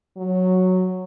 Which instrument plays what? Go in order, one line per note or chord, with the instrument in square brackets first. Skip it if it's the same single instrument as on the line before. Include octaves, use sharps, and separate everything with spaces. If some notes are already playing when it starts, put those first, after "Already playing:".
[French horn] F#3